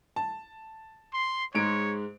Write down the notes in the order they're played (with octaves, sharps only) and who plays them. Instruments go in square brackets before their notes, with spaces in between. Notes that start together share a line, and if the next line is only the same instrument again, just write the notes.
[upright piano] A5
[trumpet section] C6
[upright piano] G#2 G#3 D7 [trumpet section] C#5